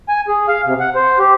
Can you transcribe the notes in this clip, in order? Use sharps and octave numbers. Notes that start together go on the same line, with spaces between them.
G#5
G#4
F5
C3
F#5
C5
G4